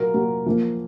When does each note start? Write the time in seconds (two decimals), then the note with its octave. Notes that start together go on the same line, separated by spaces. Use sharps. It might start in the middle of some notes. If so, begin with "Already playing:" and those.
Already playing: A#2 F#3 A#3 A#4
0.14 A#2 F#3 A#3
0.46 A#2 F3 A#3